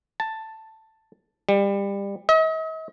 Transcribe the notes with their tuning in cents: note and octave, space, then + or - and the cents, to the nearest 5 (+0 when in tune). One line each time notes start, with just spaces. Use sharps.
A5 +5
G3 +25
D#5 +45